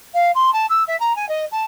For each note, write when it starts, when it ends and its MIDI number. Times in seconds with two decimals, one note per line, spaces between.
0.14 0.31 77
0.35 0.53 84
0.53 0.66 81
0.69 0.84 88
0.87 0.98 76
1.00 1.15 82
1.16 1.28 80
1.29 1.45 75
1.52 1.65 81